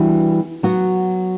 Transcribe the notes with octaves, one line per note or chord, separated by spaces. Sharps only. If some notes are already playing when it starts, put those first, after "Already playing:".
Already playing: E3 G3 B3 D4 F#4
F#3 B3 F#4